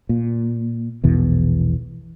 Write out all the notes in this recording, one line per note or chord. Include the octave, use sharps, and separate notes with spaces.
A#2
A#1 E2 B2 E3